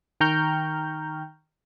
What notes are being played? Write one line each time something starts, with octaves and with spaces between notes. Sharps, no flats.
D#3 G5 A#5 C#6 F6 G6